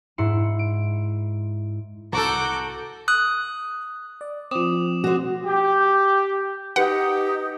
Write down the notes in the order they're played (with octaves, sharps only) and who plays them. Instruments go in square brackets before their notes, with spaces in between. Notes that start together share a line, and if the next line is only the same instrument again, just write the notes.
[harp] G#2 E4 C6 C#7 E7
D7
[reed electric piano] C2 A#5 [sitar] F#4 A4 [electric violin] D6 G6
[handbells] D#6 F#6
[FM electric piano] D5
[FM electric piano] F3 C4 [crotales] D6 D#6 E7
[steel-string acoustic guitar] F#4 C5
[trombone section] G4
[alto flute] D#4 [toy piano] F#4 B4 [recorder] G4 [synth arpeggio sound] F#5